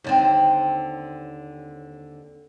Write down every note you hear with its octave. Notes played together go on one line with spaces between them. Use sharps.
D#2 D3 C4